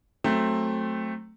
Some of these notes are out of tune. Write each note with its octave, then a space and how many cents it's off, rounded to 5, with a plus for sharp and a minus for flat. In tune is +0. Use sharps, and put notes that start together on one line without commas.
F#3 +0 A3 +0 C4 +15